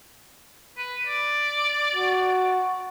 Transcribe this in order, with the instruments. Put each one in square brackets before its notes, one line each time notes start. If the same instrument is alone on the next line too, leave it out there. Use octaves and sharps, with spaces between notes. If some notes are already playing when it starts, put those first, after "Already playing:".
[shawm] B4
D5
[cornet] F#4